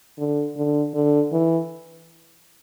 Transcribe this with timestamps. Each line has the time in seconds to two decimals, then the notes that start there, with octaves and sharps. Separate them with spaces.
0.19 D3
0.57 D3
0.94 D3
1.32 E3